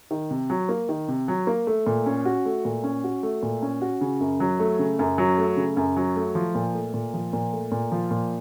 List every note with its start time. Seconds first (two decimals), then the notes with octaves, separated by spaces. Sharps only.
0.11 D#3
0.31 C3
0.50 F#3
0.69 A#3
0.89 D#3
1.08 C3
1.28 F#3
1.47 A#3
1.67 A3
1.87 A#2
2.06 C#4
2.25 F#4
2.45 A3
2.65 A#2
2.84 C#4
3.04 F#4
3.23 A3
3.43 A#2
3.62 C#4
3.82 F#4
4.01 C#3
4.21 F#2
4.40 F#3
4.59 A3
4.79 C#3
4.99 F#2
5.18 F#3
5.38 A3
5.57 C#3
5.77 F#2
5.97 F#3
6.16 A3
6.35 F3
6.55 A#2
6.74 A3
6.94 A#2
7.14 F3
7.33 A#2
7.53 A3
7.72 A#2
7.92 F3
8.11 A#2